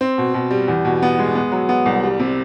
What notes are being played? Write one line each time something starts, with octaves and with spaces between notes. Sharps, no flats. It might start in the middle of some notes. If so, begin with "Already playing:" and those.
C4
B2
B2
G3
E2
B2
B3
G#3
B3
F#3
B3
C2
G3
C3